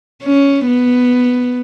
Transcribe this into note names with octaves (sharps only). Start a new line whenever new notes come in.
C#4
B3